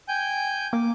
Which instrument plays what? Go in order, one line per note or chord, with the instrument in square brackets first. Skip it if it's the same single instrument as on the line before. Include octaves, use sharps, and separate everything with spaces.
[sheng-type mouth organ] G5 G#5 G6
[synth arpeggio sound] A#3 [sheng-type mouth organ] D6